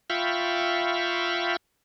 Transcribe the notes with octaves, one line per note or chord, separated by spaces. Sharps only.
F4 E5 F5 G5 B5 C#6